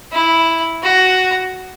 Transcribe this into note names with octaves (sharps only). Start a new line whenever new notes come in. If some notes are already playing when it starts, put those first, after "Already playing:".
E4
F#4